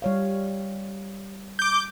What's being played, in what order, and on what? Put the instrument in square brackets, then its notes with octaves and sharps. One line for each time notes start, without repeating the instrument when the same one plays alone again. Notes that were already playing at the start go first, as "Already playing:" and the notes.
[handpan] G3 C#5 F5
[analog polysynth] D6 G6